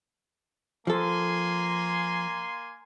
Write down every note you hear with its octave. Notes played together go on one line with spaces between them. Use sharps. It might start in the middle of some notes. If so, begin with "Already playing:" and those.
F3 A#3 A4 G#5 C6